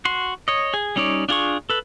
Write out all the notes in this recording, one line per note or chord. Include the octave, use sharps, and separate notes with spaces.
F#4 C6
C#5 D#5
G#4
G3 C#4 D#4 C#5 D5
D4 F4 G#4 C#6
A4 B4